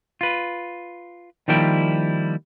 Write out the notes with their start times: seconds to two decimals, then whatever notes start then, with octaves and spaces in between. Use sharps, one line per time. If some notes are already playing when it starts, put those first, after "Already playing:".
0.21 F4 B4
1.48 D#3 F3 G3 A#3 E4 G5